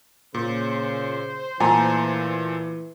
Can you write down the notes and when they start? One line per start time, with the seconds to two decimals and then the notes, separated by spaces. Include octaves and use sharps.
0.34 A#2 C#3 C5
1.60 A#2 E3 A3 G#5 A#5